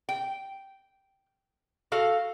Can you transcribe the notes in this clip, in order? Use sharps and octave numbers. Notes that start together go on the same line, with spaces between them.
G5
F#4 A4 F5